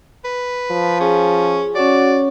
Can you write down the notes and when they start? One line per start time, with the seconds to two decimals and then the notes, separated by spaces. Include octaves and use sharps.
0.25 B4
0.71 F3
1.00 C#4 G#4
1.75 C#4 F#4 C#5 D5